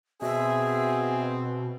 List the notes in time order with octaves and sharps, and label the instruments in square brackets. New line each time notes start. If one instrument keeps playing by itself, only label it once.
[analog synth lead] B2 [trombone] C4 [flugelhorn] G#4 [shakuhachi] E5